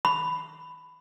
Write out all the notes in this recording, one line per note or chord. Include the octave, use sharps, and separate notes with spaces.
B5